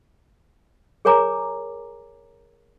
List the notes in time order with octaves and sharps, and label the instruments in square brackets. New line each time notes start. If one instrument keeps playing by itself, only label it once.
[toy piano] G#4 A#4 C#5 G#5 A#5 D6